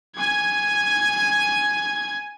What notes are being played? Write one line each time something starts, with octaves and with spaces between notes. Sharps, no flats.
G#5 G#6